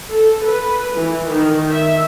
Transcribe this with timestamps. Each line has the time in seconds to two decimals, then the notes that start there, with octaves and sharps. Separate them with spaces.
0.10 A4
0.45 B4
0.96 E3
1.28 D#3
1.73 E5